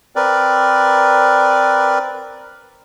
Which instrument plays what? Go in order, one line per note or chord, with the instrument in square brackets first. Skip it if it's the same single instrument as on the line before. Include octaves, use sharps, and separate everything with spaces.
[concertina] C4 A#4 B4 D5